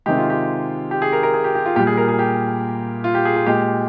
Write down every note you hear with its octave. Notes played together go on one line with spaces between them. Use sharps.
C3 D#3 G#3 G4
F4
G4
G4
G#4
A#4
A#4
G#4
G4
G4
F4
A#2 G3 G4
G#4
A#4
G#4
G4
F4
G4
G#4
G4
A#2 G#3 G4